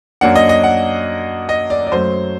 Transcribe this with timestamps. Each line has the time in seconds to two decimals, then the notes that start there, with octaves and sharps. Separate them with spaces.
0.21 F#2 F#3 A#3 D4 F#5
0.35 D#5
0.49 D#5
0.64 F#5
1.49 D#5
1.70 D5
1.87 D5
1.92 F#2 F#3 A3 C5